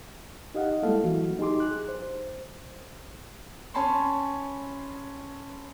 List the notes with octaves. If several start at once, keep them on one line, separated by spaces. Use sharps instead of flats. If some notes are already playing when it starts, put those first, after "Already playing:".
D#4 G4 D#5 F5 F#5
G3 G#3 A#3 E4 A4 F5
E3 F#3 E4 F#4
D#4 G4 G#4 C6 D6
F#6
C5
C#4 C#5 G#5 A5 B5 C6